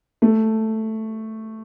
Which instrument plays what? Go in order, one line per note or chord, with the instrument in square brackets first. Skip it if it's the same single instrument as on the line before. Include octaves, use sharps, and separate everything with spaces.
[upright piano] A3